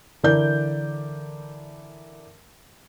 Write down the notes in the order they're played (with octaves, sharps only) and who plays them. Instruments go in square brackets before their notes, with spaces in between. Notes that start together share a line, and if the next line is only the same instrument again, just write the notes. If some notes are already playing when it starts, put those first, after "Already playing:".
[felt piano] D3 E3 A#4 D5 G6